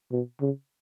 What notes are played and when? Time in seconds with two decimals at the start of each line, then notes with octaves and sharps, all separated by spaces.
0.12 B2
0.41 C#3